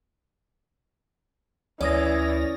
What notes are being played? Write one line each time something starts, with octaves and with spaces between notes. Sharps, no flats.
D2 E3 C#4 D5 D#6 A#6